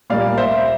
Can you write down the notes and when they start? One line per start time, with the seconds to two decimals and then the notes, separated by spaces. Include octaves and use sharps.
0.10 A#2 G3 A#3 D5 F5
0.38 C5 E5